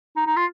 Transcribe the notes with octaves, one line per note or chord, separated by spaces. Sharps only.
D#4
D#4
F4